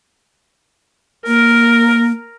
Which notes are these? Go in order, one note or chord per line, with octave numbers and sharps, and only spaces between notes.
A#3 A#4